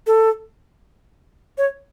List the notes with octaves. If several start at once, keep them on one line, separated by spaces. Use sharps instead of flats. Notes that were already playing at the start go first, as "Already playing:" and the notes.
A4
C#5